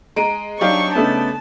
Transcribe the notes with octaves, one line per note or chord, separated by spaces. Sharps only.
G#3 A#5 D7 D#7
F#3 D4 D#4 G4 D5 F5 C#6
C#3 A3 B3 A5